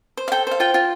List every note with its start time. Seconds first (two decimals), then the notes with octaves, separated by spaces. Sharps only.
0.17 C5
0.28 F5
0.32 A4 G5
0.47 C5 F5
0.60 F4 G5
0.74 F4